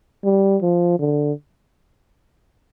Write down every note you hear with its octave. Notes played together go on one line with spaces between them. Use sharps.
G3
F3
D3